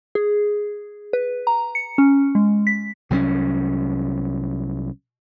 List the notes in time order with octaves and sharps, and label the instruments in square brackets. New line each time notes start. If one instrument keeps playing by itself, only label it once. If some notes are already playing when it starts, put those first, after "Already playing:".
[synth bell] G#4
B4
A#5
C#7
C#4
G#3
B6
[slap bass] C2 F#3 G3 C#4